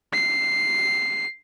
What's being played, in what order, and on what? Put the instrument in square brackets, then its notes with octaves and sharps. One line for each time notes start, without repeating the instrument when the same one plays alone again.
[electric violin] C7